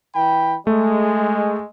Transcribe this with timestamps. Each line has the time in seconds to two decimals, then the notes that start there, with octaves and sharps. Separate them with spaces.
0.15 E3 G5 B5
0.67 G#3 A3